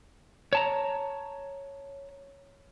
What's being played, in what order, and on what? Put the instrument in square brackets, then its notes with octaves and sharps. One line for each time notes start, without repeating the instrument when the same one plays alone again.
[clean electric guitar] C#5 A5 A#5